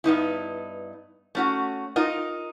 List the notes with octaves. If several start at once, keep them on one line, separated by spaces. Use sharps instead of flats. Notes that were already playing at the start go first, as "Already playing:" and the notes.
G2 B3 D#4 E4
A3 C#4 F#4
D#4 F4 A#4 D#5